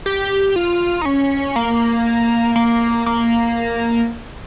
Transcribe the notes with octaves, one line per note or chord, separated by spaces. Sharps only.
G4
F4
D#4
C#4
A#3
A#3
A#3